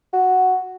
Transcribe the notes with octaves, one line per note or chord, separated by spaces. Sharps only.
F#4